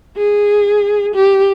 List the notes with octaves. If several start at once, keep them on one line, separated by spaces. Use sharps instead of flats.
G#4
G4